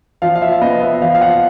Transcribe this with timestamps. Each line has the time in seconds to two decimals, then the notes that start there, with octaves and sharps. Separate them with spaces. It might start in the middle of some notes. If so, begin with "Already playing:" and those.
0.22 F3 F5
0.35 F5
0.42 E5
0.61 B3 D#5
0.82 E5
1.02 F3 F5
1.15 F5
1.21 F#5